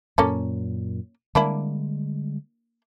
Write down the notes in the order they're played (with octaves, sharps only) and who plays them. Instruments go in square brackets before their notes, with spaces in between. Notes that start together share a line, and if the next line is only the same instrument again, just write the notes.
[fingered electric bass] F#2 A#2 [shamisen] A#3 C#4 A4
[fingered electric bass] D3 G3 G#3 [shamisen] A#3 D4 E4